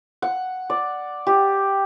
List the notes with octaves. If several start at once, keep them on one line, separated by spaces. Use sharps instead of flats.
F#5
D5
G4